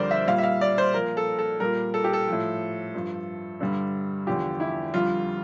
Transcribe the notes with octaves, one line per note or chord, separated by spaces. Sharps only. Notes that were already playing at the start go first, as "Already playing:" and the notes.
Already playing: F2 D3 G3 A#4 C5 D5
E5
A#2 G3 F5
E5
F5
D5
C5
A#2 F3 A#4
A4
A4
A#2 G3 A#4
A4
G4
A4
F3
A2
G2 F3
G2 D3 G3
E2 D3 F3 G4
E4
F2 D3 G3 F4